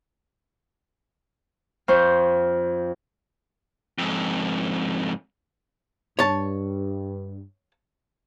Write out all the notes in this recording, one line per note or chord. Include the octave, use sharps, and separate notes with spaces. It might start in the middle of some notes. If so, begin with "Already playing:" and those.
F2 F4 C5 C#6 G6
F2 G#2
G2 C#5 A5